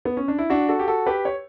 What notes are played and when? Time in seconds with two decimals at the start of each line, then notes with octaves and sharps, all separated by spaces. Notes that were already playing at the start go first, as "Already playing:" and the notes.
0.05 B3
0.17 C#4
0.28 D4
0.38 E4
0.50 D4 F#4
0.68 F#4 A4
0.79 G4
0.88 F#4 A4
1.06 G4 B4
1.25 C#5